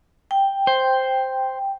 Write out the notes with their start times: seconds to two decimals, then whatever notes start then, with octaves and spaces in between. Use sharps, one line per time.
0.31 G5
0.67 C5